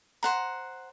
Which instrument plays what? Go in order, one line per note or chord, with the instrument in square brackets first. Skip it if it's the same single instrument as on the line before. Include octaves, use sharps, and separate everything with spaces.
[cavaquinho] C5 F#5 A#5